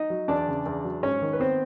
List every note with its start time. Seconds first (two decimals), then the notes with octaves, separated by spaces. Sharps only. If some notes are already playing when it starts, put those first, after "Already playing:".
Already playing: D#4 D#5
0.10 F#3
0.28 E2 D4 D5
0.48 C#3
0.66 E2
0.84 F#3
1.03 G#2 C#4 C#5
1.22 D#3
1.33 B4
1.40 B3 C4 C5